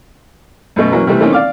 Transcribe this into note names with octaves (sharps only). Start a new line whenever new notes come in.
F#2 B2 A3
E3 F#3 A#3 C#4
C3 E3 G3 A3
E3 A3 A#3 C4 C#4 D#4
D5 F5 D6